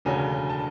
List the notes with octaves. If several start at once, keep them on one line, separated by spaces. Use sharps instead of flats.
E1 D2 C#3 F#3 G#5
A5